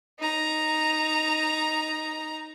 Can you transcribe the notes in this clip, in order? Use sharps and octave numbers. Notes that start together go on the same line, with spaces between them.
D#4 A#5